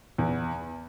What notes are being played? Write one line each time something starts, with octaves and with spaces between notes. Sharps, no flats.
E2